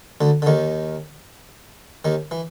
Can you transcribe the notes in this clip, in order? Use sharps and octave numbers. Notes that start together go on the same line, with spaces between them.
D2 D3
D3
D#2 D#3
D#2 D#3
E3